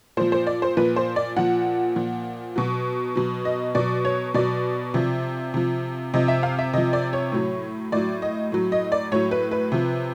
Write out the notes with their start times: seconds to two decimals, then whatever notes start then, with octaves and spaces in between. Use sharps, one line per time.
0.17 A#2 F3 C5
0.32 C5
0.47 D5
0.62 C5
0.77 A#2 F3 B4
0.96 C5
1.16 D5
1.36 A#2 F3 F#5
1.96 A#2 F3
2.56 B2 F#3
3.16 B2 F#3
3.45 D#5
3.75 B2 F#3 D5
4.05 C#5
4.34 B2 F#3 D5
4.94 C3 F3
5.54 C3 F3
6.14 C3 F3 D#5
6.28 E5
6.43 F5
6.59 E5
6.73 C3 F3 D#5
6.93 D5
7.13 C#5
7.32 A2 F#3
7.92 A2 F#3 D5
8.22 D#5
8.52 A2 F#3
8.72 D#5
8.92 D5
9.12 A2 F#3 C#5
9.31 B4
9.51 B4
9.72 C3 F3